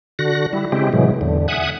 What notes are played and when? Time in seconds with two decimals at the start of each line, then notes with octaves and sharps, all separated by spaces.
0.19 D3 F#4 F#6 A#6
0.53 G3 E4
0.72 C#3 G#3 C4 E4 G4
0.93 A2 C3 E3 F#3 G#3
1.21 E2 D3
1.48 E5 F#5 G#5 D#6 F#6